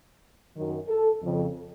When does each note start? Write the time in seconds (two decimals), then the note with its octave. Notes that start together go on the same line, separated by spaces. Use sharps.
0.54 F#2 D#3
0.88 A4
1.22 F2 C#3